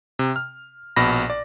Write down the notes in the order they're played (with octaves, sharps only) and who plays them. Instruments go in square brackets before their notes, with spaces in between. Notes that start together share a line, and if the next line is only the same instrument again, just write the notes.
[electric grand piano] C3
F6
A#1 B2 B5 A#6
D5